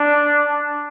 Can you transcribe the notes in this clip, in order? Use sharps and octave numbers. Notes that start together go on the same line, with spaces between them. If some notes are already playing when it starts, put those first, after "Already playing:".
Already playing: D4